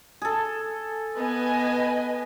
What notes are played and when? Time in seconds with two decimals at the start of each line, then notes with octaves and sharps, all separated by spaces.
0.22 G#4 A4
1.16 B3 B4 D#5 G#5